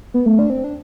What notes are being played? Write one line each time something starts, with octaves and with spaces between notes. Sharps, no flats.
B3
A3
D4
C4
D4